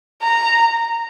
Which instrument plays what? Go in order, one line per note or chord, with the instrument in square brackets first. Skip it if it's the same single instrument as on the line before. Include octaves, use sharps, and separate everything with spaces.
[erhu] A#5